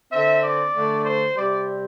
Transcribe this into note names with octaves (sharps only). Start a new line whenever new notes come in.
D3 C4 E5
D5
D3 A3 D4
C5
C3 G3 C4 D5